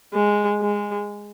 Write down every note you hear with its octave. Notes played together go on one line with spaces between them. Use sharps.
G#3
G#3